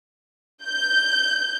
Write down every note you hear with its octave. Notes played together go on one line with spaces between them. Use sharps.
G6